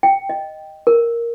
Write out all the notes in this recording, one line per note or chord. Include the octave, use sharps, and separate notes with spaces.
G5
D#5
A#4